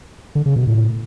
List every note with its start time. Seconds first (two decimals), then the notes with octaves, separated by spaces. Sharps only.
0.35 D3
0.46 C#3
0.56 B2
0.67 A2